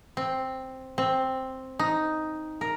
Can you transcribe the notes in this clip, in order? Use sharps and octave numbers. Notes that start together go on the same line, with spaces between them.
C4
C4
D#4
A#4